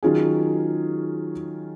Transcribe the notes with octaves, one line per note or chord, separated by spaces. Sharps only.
D#3 F#3 C#4 F4 G#4